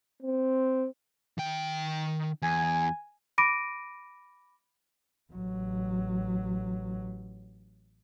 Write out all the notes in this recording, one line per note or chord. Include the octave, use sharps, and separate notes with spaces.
C4
D#3 G5
E2 G#5
B5 D6 A#6 D7 D#7
A1 F#3